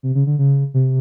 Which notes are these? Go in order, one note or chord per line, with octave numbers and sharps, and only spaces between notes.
C3
C#3
D3
C#3
C3